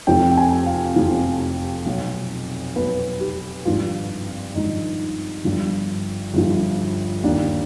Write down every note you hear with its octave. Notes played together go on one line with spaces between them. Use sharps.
F1 F2 C3 F3 G5
G5
G#5
F5
F1 F2 C3 F3
B1 B2
B1 B2 B4
G4
G#1 G2 F3 F4
G#1 G2 F3 D#4
G1 G2 F3
G1 G2 F3
D#2 D#3 D4